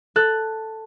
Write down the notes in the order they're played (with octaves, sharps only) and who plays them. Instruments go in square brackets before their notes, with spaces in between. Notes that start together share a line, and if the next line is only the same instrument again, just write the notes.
[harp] A4 F#6